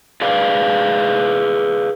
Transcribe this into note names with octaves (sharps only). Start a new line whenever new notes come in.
G#4 B4 D5 F5